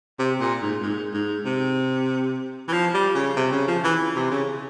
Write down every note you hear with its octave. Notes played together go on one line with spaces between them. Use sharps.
C3
A#2
G#2
G#2
G#2
C3
E3
F3
G3
C#3
C3
C#3
F3
E3
C3
C#3